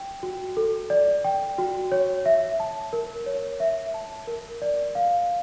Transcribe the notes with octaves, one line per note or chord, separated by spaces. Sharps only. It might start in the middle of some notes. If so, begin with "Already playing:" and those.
Already playing: G5
F#4
A4
D5
G5
F#4
C#5
E5
A5
A#4
C#5
E5
A5
A#4
D5
F5